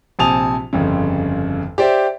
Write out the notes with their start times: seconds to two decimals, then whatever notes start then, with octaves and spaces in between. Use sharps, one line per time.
0.19 A#1 C3 G#5 A5 D#6 F7
0.73 G1 F2 C#3
1.78 G4 C5 D5 E5